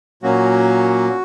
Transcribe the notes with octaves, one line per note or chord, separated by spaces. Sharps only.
A#2 F#3 A#3 C#4 F#4